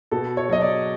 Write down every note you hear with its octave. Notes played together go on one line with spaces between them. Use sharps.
B2 A4
C#5
F#3 D#5
D5